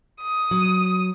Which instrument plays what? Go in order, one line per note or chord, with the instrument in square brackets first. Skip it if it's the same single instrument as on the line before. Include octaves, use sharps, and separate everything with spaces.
[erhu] D#6
[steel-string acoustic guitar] F#3